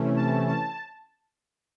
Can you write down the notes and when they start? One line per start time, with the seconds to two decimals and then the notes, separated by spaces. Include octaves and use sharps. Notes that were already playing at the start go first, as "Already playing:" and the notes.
Already playing: C3 E3 A3 C#4
0.16 A5
0.48 A5